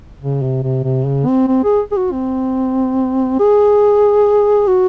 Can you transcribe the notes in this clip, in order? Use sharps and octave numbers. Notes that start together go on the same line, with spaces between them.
C#3
C3
C3
C3
C#3
C4
C4
G#4
G#4
F#4
C4
G#4
F#4